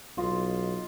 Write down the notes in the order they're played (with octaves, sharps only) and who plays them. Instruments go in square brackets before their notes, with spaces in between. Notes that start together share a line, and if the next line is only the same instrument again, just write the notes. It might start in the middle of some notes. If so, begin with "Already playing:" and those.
[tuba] B1 [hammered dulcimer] F4 D#5